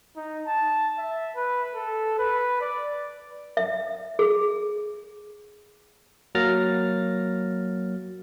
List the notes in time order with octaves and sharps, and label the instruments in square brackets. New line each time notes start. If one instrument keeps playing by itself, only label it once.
[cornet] D#4
A5
E5
B4
A4
B4
D5
[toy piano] E5
G#4
[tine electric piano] F#3 A#3 F6 A6 A#6